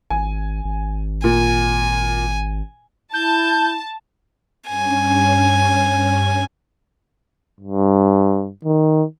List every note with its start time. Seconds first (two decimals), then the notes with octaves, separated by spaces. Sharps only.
0.10 G#1 G#5
0.65 G#1
1.24 A#2 G#5
3.13 E4 A5 G6
4.68 G2 C#4 G#5
7.60 G2
8.65 D#3